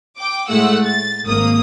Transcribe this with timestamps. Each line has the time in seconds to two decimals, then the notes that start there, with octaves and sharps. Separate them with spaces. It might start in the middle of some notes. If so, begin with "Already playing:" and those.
0.19 G5 D6
0.48 A2 G#3 A3 F#5 E6
0.83 A6
1.26 G#1 G#2 A#3 D#6